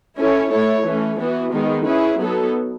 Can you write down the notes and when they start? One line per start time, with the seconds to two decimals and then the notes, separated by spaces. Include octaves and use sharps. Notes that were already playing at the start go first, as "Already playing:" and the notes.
0.17 C#4 E4 A4 C#5
0.51 A3 E4 A4 C#5
0.85 E3 A3 C#4
1.19 E3 B3 F#4
1.52 D#3 G#3 B3 D#4
1.86 C#4 E4 G#4 B4
2.19 F#3 B3 D#4 A4